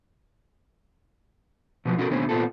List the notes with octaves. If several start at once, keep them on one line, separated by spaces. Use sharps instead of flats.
B2 F3 F#3
B2 C#4 E4 F#4 A4 A#4
D#2 B2 D3 A3 C4 C#4
A#2 B3 C4 F4 A4